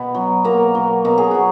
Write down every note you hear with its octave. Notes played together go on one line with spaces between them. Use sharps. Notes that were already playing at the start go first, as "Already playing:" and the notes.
Already playing: B2 B3
F#3
B2 A#3 A#4
F#3
B2 A#4
G#4
F#3 F#4